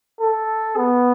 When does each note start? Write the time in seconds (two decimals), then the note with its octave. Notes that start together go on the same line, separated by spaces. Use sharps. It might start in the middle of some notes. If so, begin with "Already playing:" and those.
0.21 A4
0.77 B3